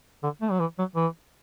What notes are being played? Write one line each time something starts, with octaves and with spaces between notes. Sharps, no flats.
D3
A3
F#3
E3
F#3
E3